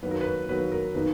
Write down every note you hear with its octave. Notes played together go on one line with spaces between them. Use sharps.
D#3 F#3 A#3 B4
A#4
B4
D#3 F#3 A#3 B4
A#4
D#3 A#3 D#4 B4